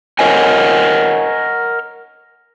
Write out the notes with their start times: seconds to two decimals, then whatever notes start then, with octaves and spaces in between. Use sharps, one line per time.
0.19 A#4 C#5 D#5 F#5 G#5